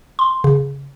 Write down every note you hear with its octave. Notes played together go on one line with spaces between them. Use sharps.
C6
C#3